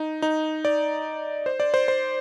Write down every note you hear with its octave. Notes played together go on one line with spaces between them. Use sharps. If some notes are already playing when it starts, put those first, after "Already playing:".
Already playing: D#4
D#4
D5
C5
D5
C5
C5